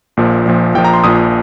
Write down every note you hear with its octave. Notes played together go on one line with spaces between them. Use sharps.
A#1 A#2 F3
A#1 A#2 F3
A#1 A#2 F3 G5
A#5
C6
A#1 A#2 F3 D#6